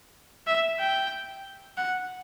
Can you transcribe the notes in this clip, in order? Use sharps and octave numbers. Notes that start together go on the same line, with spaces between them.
E5
G5
F#5